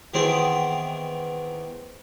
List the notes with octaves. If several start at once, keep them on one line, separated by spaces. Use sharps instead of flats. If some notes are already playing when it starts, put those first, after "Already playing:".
D#3 E3 B3 C4 G#4 C5